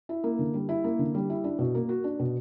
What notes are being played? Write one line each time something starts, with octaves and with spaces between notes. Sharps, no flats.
E4
A#3
D3
G3
E4
A#3
D3
G3
E4
D4
B2
A#3
F#4
D4
B2